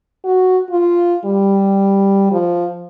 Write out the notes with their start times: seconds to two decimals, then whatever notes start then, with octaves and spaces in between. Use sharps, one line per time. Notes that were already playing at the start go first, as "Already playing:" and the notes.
0.24 F#4
0.70 F4
1.25 G3
2.32 F3